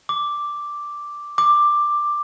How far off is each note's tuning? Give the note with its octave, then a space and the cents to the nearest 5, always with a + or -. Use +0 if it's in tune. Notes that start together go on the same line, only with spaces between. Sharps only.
D6 +0
D6 +10